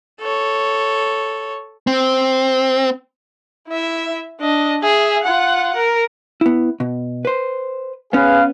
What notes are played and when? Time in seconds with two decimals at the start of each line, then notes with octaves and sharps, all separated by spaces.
0.20 A4 C#5
1.87 C4
3.68 E4 E5
4.40 D4 D#5
4.83 G#4 E5
5.24 F4 F#5
5.76 A#4
6.41 B3 E4
6.80 B2
7.25 B4 C5
8.13 B3 C#4 G#4 B4 F5